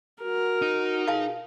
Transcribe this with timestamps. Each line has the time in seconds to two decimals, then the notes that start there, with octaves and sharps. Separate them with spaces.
0.22 F#4 A#4
0.62 D#4
1.08 B2 F4 G#4 F5 A5